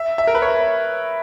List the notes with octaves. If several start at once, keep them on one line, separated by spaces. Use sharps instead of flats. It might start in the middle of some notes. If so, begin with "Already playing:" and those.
Already playing: E5
E5
A#4
B4
C#5